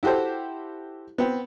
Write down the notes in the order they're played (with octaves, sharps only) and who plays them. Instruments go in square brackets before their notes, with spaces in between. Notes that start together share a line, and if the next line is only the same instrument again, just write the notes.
[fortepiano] E4 F#4 G4 A4 C5
B3 C4